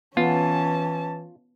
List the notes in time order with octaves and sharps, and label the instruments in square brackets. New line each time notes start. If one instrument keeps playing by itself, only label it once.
[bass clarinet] E3 [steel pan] B3 [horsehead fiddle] C#4 A5 [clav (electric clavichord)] F4